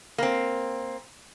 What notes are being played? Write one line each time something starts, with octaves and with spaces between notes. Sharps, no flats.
A#3 C4